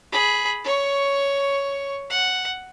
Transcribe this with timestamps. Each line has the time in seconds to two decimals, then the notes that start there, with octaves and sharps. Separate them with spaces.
0.12 G#4 B5
0.64 C#5 C#6
2.10 F#5